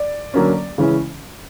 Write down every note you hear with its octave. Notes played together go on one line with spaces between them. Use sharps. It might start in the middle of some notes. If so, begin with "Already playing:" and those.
Already playing: D5
D3 F#3 A#3 C#4
C#3 E3 G#3 C#4 E4